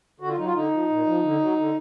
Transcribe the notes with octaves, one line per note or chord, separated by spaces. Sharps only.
D3 F#4
F4
F#3 D#4
F4
D3 D#4
F3
A#2
F3
D3
F#3
D3